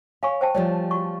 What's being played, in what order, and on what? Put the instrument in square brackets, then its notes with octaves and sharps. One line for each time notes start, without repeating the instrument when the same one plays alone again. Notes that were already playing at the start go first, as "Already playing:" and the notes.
[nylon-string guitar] C#5 [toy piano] F5 G#5 C#6
[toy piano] C5 G5 A5
[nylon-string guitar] F3 G3 A3 [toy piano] C#5 D5
[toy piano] F#4 C#6